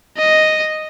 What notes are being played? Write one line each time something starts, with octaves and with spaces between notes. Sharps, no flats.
D#5